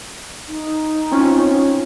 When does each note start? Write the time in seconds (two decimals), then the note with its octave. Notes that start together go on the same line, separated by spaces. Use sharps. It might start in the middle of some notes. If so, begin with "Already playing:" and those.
0.48 D#4
1.11 C4 C#4 F4